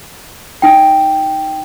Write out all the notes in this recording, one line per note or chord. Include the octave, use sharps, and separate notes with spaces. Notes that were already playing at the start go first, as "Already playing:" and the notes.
D#4 G5